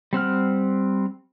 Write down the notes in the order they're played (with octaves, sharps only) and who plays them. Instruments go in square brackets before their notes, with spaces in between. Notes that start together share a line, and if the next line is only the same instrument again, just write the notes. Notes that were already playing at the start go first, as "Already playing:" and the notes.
[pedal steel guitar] G3 C4 F#5 F6